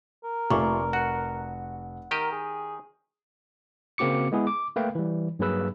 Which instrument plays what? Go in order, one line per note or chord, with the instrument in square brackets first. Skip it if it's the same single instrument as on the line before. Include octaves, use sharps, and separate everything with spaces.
[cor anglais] A#4
[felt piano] F1 C#6 [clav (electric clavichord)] A#2 [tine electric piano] A3 F4
[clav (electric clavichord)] F#4 [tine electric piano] F#5
[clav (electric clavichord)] D#3 G4 D#5 [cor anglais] A#4
[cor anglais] G#4
[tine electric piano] C#3 A#3 C4 F#4 D6 C#7
G#3 B3 E4 G#4
D6
A3 A#3 B4 F5 G5
E3 G3
G2 F#3 A#3 G#4 B4 E6